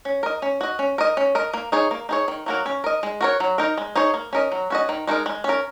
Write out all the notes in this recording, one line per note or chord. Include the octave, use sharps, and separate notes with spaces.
C#4
A#4 D#5
C#4
F#4 D#5
C#4
A#4 D#5
C#4
A#4 D#5
A#3
D#4 G#4 C#5
A#3
D#4 G#4 C#5
D#3
F#3 A#3 F#4 A#4
C#4
A#4 D#5
G#3
F#4 A#4 C#5
F#3
D#4 A#4
G#3
D#4 G#4 C#5
A#3
C#4 A#4 D#5
F#3
C#4 F#4 D#5
D#3
G#3 D#4 F#4 A#4
G#3
C#4 A#4